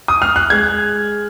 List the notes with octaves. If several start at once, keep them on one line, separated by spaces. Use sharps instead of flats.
D#6
F6
F#6
G#3 G#6